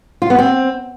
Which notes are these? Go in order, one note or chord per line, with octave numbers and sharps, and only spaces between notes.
F4
B3
C4